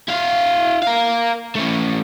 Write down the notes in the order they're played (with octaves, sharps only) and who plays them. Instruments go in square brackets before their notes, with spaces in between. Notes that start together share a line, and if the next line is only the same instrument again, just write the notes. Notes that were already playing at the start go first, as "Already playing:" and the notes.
[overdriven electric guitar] E4 F5
A#4 F5
A3 C#4